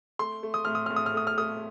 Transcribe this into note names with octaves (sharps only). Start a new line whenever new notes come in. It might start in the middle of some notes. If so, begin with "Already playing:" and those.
A3 C6
A3
D#6
A2 F6
D#6
A2 F6
D#6
F6
A3 D#6
F6
A3 D#6